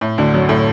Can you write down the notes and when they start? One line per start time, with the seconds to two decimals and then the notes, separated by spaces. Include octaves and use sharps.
0.01 A2
0.18 D2 D3
0.34 F#2 F#3
0.49 A2 A3